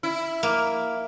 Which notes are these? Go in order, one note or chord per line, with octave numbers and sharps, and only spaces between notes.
E4
A#3